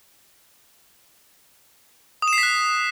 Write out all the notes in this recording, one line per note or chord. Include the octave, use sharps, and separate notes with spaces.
D#6
E7
C7
B6
F#6